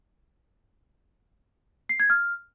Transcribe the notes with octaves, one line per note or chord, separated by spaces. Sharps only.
C7
G#6
F6